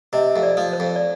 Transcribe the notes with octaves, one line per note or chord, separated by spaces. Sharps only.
C3 D#5
F2
D5
F3
C5
F2
D5